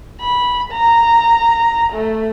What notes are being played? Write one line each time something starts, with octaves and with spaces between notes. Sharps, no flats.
B5
A#5
A3